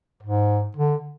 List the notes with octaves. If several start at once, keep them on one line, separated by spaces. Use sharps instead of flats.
G#2
D3